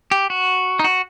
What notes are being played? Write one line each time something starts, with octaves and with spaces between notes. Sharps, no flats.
G4
F#4
D#4
F#4